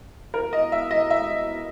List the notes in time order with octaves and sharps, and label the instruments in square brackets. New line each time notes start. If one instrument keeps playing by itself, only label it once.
[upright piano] A#4
D#5
E5
D#5
E5